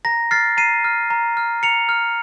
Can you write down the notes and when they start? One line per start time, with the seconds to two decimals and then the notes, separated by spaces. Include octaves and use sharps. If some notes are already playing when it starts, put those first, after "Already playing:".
0.05 A#5 A#6
0.31 F6 A6 C7
0.57 A#5 C7 D#7
0.84 F6
1.10 A#5
1.37 F6
1.63 A#5 C#7 F7
1.89 F6